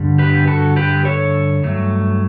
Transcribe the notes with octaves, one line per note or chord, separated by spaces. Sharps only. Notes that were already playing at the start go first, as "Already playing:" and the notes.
Already playing: G2 D3 G3
G4 B4
F#4 A4
G4 B4
A4 C#5
G2 F#3 A3